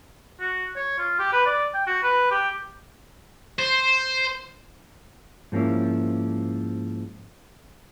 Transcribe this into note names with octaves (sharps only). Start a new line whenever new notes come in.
F#4
C#5
F4
G4
B4
D5
G5
F#4
B4
G4
C5
G#2 F3 A#3 C#4 E4